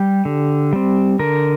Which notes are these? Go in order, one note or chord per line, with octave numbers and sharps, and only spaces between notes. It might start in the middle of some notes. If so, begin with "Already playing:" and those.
Already playing: G3 G4
D3
G3 C4
D3 A#4